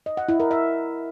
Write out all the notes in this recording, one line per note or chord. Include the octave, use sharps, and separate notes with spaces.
D#5
F#5
E4
A#4
E5